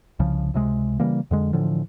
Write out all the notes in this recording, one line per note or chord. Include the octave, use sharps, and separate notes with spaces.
C2 C#3 F3
C#2 C3 G#3
C#3 E3 G3 A#3
F2 D3 G#3
A2 D3 E3 F3